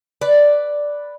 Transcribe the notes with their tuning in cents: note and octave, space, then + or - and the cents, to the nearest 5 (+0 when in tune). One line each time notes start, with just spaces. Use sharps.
B4 +0 D5 +0